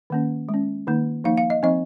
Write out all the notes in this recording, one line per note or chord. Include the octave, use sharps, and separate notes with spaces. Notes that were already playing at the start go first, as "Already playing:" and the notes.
D#3 A#3 C#4
G#3
C#4
D#3 A#3 D#4
F3 A#3 D#4 F5
F5
D#5
F3 C4 D#4 D#5